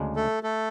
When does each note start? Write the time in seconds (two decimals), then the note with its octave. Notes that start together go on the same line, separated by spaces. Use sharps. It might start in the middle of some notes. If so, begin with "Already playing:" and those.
Already playing: D2 C#3 G#3 D4
0.16 A3 A4
0.43 A3 A4